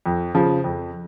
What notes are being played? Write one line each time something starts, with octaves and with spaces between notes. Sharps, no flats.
F2
C#3 F3
F2